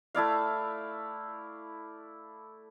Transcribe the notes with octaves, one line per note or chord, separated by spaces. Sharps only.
A3 E4 D5 F5